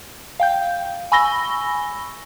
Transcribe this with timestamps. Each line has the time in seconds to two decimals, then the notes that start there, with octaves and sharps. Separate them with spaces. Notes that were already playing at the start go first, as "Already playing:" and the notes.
0.40 F5 G5 G6
1.12 G#5 B5 C#6 E6 A#6 G7